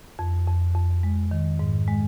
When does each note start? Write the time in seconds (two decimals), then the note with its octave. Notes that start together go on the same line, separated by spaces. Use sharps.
0.19 F2
0.47 F2
0.75 F2
1.03 G#3
1.31 D#3
1.59 G#2
1.87 G#3